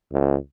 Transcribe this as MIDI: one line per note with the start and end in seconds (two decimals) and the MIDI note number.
0.13 0.36 37